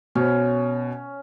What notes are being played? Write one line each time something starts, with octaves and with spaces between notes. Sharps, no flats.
B2 C#4